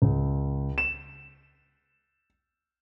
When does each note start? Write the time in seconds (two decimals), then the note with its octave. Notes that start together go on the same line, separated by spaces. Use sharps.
0.02 C#2
0.78 E7